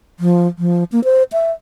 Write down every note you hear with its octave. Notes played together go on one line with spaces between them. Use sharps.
F3
F3
A#3
C5
E5